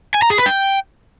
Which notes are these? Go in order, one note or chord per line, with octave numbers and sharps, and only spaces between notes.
G#5
A#5
G#4
B4
G5